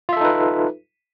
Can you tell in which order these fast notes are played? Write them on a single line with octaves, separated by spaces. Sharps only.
F4 E5 A4 D#4 B4